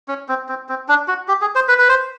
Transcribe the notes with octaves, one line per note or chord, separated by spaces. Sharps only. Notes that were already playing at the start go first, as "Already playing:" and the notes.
C#4
C4
C4
C4
D4
F#4
G4
G#4
C5
B4
B4
C5